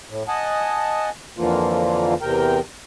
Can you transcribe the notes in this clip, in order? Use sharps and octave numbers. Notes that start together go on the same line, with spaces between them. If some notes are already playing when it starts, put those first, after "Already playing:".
A2
D#5 F#5 G#5 A5
F2 D3 E3 F3 A#3 F4
E2 C3 A#4 G5